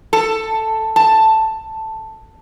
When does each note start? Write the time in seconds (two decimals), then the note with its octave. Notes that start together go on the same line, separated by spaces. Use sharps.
0.13 A4
0.96 A5